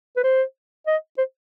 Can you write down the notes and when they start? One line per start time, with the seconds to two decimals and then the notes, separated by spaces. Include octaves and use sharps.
0.17 B4
0.24 C5
0.87 D#5
1.18 C5